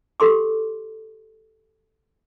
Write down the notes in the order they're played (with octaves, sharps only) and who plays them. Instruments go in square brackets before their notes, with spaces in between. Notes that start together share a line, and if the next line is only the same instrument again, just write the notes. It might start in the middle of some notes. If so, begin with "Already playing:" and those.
[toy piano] G4 A4 C6 D6